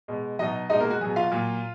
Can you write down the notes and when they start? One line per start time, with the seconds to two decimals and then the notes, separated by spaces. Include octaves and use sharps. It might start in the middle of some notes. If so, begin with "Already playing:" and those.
0.08 B2 G#3
0.39 B2 F#3 D#4 D#5
0.70 G#3 D#4 D#5
0.72 B2
0.80 A#3 A#4
0.90 F#4
1.01 B2 F#3 G#4
1.16 F4 F5
1.31 A#2 F#3